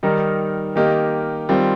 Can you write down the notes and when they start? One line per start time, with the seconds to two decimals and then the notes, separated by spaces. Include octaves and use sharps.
0.03 D#3 G3 D#4 A#4
0.76 D#3 A#3 G4 A#4 D#5
1.49 D#3 G3 C4 F4